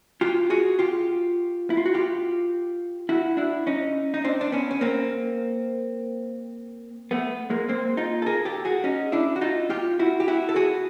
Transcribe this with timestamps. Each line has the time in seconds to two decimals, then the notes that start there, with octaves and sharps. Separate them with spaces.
0.21 F4 G4
0.50 F#4 G#4
0.79 F4 G4
1.70 E4
1.77 F4
1.86 F#4
1.94 F4 G4
3.09 E4 F#4
3.37 D4 E4
3.67 C#4 D#4
4.14 D#4
4.24 C4 D4
4.41 D4
4.52 B3 C#4
4.71 C#4
4.81 A#3 C4
7.11 A3 B3
7.50 G#3 A#3
7.69 A#3 C4
7.97 D#4 F4
8.22 A4
8.26 G#4 A#4
8.45 G4 A4
8.65 F#4 G#4
8.84 C#4 D#4
9.12 D4 E4
9.36 F#4
9.41 D#4 F4
9.70 F4 G4
9.99 E4 F#4
10.20 G4
10.28 E4 F#4
10.49 A4
10.56 F#4 G#4